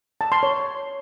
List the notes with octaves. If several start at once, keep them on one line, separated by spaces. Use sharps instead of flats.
A5
C6
C#5